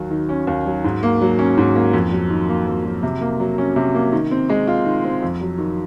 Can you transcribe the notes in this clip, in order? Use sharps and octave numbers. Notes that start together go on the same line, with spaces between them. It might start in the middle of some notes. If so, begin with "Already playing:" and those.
Already playing: D#2 F#3
D#3
C#4
D#2
F#3
G#2
A#3
F#3
C#4
G#2
A#3
F2
F#3
D#3
A#3
F2
F#3
C3
A#3
F#3
C#4
C3
A#3
D#3
C4
G#3
F4
D#3
C4
F2
F#3
D#3